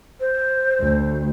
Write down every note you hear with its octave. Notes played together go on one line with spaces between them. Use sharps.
C5
D2